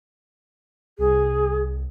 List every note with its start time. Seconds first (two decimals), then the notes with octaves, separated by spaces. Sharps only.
0.98 C2 G#4